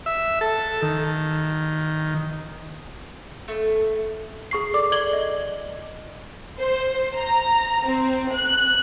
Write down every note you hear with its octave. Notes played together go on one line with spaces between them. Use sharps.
E5
A4
D#3
A3
G#4 C#6 C7
A4 D5 D6
D5 G#6 F#7 G7
D#5
C5
A#5
C4
F#6